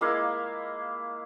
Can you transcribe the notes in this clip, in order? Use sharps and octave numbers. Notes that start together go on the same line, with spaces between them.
G#3 A#3 E4 F5